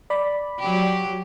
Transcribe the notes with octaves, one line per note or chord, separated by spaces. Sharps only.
D5 B5
F#3 G4